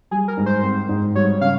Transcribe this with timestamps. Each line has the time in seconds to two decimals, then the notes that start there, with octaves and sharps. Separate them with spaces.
0.11 G3 G#4
0.28 A#4
0.37 G#2
0.46 C5
0.63 C4
0.89 G#2
1.15 G3 C#5
1.41 C#3 F5